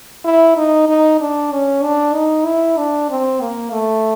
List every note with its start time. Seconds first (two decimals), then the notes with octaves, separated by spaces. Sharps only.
0.24 E4
0.57 D#4
0.88 D#4
1.20 D4
1.52 C#4
1.83 D4
2.14 D#4
2.45 E4
2.77 D4
3.10 C4
3.41 A#3
3.72 A3